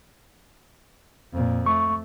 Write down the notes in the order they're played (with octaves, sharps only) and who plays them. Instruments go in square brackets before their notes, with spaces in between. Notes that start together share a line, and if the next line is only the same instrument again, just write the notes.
[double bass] F2 A#2
[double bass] A3 [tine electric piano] C#6